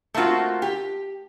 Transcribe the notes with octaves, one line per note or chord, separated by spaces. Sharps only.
A3 A#3 C4 F4 F#4
G4